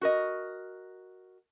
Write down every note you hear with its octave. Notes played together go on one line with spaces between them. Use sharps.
F#4 A#4 D#5